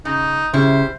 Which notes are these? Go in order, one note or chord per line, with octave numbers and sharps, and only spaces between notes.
C#3 D#4
C#3 G3 E4 C5